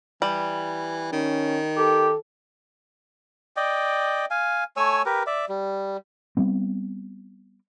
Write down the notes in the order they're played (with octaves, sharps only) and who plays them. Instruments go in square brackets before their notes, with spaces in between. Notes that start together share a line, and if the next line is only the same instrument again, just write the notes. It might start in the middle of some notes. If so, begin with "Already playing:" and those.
[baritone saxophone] E3 [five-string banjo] G3
[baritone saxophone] D#3 [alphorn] C#4
[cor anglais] G4 [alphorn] A4
[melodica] D5 D#5 G5
F5 G#5
A3 C#5 G#5 E6
G4 A#4 B4
D5 E5
G3
[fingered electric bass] G3 B3 C4